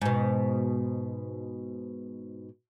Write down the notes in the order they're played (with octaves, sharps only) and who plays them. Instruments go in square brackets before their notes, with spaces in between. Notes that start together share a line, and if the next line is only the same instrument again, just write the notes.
[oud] G#2 B2